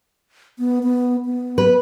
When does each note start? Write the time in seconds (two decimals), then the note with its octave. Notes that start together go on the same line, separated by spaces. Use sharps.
0.59 B3
0.83 B3
1.25 B3
1.58 B4